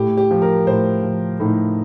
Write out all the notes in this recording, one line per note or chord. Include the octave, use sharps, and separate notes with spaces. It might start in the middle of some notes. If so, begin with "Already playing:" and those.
Already playing: A2 G4
G4
F3
A#4
A2 C5
F3
A2 D#4